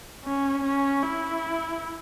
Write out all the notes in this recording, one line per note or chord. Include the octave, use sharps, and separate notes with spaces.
C#4
C#4
E4